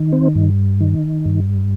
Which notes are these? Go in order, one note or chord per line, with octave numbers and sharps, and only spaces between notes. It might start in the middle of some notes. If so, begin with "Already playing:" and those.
Already playing: D#3
C4
G2
D#3
G2